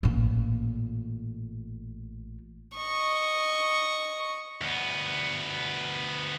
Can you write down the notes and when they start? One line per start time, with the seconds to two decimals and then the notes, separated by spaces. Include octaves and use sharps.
0.03 A1 A#2
2.76 D#5 C#6
4.61 D2 B3